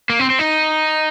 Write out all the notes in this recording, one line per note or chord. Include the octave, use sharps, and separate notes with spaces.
A#3
C4
C4
D#4